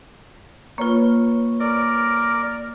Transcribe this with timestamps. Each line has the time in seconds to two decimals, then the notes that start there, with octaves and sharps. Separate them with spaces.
0.78 A#3 F4 B4 C#5 C#6
1.60 A#4 D5